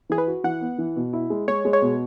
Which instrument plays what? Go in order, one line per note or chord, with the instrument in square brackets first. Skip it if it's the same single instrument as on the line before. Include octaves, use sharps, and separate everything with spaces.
[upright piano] E3 [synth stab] G#4
[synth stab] B4
[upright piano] F#4
[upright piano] E3 [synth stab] F#5
[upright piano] B3
E3
B2
E4
G#3
[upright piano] G#3 [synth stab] C#5
[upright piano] G#3
[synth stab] C#5
[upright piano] B2